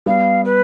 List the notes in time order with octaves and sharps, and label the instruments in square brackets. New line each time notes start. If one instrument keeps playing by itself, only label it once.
[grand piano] G3 B3 [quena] F5
[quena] B4